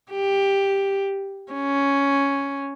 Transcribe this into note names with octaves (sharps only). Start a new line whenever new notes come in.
G4
C#4